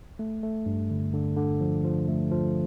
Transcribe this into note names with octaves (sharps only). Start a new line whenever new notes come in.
A3
A3
G2
D3
D3
D3
F3
F3
A3
F3